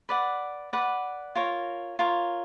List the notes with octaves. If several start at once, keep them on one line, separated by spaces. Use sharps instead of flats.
B4 D5 F#5
B4 D5 F#5
F4 A#4 C#5
F4 A#4 C#5